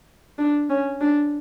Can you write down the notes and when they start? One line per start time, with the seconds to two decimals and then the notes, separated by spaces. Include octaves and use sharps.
0.39 D4
0.70 C#4
1.01 D4